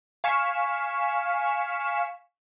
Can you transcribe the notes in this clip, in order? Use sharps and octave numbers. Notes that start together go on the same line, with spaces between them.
F5 G#5 C#6 B6 E7